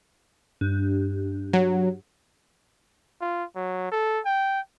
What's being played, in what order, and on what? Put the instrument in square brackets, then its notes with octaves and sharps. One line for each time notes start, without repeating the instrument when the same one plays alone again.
[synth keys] G2
[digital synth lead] F#3
[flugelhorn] F4
F#3
A4
G5